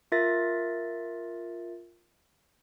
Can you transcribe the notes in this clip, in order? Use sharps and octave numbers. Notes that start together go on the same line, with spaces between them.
F4 A#4 E5 A6 A#6